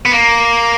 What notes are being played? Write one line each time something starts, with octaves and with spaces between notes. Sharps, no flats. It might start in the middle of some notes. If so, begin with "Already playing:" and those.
B3
A#3